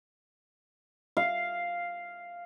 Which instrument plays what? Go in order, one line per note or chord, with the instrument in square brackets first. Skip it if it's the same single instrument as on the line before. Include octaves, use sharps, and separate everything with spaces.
[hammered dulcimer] F5